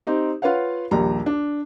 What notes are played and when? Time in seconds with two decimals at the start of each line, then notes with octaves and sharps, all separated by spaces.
0.07 C4 D#4 G4
0.42 F4 B4 C#5 F5 F#5
0.91 A#1 D#2 G3 A#5
1.26 D4